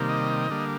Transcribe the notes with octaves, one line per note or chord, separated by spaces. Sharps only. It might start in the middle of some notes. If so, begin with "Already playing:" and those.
Already playing: C3 D#3 G3 A#3
D#5
D3 G3 A#3